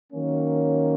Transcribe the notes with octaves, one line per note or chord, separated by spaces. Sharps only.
D#3 F#3 A#3 C#4